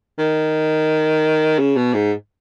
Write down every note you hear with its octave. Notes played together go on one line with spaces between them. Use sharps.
D#3
C#3
B2
G#2